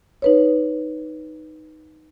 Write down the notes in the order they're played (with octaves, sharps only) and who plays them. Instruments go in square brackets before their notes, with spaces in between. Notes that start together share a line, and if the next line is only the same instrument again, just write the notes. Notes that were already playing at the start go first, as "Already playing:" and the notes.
[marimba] D#4 B4 C#5